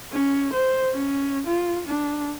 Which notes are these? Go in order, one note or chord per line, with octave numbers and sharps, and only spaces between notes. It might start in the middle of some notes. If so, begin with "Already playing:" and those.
C#4
C5
C#4
F4
D4